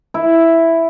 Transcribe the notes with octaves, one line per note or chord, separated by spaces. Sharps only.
E4